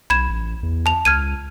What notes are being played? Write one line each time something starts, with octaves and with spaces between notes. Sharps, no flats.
B1 B5 G#6 E7
A1
E2
A5 F7
C#2 F6 G#6 D#7